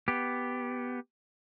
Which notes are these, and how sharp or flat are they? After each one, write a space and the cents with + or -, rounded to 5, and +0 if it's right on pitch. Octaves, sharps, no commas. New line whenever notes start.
B3 +0 G4 +0